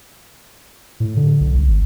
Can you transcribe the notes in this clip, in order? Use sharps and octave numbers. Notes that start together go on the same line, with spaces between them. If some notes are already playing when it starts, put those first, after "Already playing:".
A2
D3
B1
C2
G#1